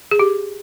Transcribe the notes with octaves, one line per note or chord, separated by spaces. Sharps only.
G#4
G4